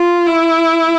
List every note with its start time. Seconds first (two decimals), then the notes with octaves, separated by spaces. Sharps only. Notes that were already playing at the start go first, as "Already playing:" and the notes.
Already playing: F4
0.26 E4